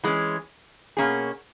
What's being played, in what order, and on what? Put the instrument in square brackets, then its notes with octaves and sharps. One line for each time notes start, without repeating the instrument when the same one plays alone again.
[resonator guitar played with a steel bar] E3 G#3 C#4
B2 A#3 C#4 G#4